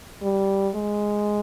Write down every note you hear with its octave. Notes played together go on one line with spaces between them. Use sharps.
G3
G#3